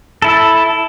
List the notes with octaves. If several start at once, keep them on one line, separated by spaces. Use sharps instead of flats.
E4 A4